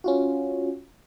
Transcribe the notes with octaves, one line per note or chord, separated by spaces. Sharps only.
C#4 F4 F#4